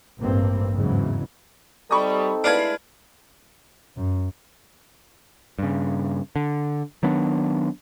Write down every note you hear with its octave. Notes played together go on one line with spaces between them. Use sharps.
A1 G2 A#3 C4
E2 G#2 C#3 E3 F#3
G3 C4 D#4 A4 B5 C#6 D#6
G#3 A3 D4 E4 B4 F5 F6 G#6
F#2
G2 C#3
D3
D#3 F#3 B3 D4